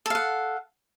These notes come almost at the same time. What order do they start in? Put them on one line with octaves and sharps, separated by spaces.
A4 F5 F#5